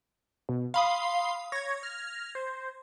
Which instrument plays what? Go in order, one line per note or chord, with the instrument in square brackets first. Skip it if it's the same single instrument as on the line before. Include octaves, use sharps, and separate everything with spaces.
[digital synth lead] B2
[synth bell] F5 B5 D#6 [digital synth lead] C6
[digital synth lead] C#5 [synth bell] G#6 A#6
[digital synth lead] F6
C5